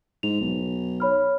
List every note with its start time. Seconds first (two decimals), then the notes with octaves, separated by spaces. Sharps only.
0.23 G#2 F7
0.41 B1
1.00 C#5 B5 F6